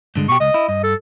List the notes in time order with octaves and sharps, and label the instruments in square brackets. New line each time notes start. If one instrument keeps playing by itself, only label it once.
[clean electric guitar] G2 D3 G#3
[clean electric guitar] B2 G4 [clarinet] C#6
[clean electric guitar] C#2 [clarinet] D#5
[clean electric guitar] E4
[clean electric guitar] G2 [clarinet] D#5
[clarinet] A4